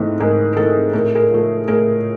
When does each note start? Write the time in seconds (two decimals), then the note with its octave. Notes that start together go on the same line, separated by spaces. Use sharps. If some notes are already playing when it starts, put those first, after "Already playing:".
Already playing: G#2 E3 A3 C4
0.20 G#2 G#4 A#4
0.53 A#4
0.57 E3 A3 C4 A4
0.93 A2 A#4
1.04 A4
1.15 G#4 A#4
1.30 F3 A3
1.68 A2 G#4 A#4